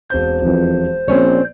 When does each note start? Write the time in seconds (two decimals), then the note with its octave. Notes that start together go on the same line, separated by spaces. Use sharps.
0.10 E1 C4 C5 G6
0.42 E1 F2 E3
1.08 A#1 C4 C#4 C#5 D5